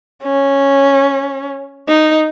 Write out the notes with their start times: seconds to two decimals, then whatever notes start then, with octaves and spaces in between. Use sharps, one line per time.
0.23 C#4
1.88 D#4